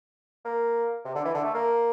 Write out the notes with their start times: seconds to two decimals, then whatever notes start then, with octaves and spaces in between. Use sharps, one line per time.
0.45 A#3
1.05 C3
1.15 D3
1.25 E3
1.34 D3
1.44 A3
1.54 A#3